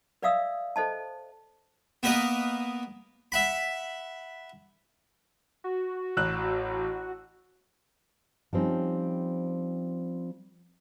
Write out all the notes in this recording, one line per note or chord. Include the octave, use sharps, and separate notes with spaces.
B4 D5 E5 F5 D#6 E6
A4 C5 D#5 A5
A#3 B3 A#4 B4 D#5
E5 F#5 B5
F#4
A1 E6 F#6
F3 G3 C4 C#4 D#4